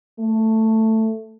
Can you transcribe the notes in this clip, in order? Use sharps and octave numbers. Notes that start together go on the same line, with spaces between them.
A3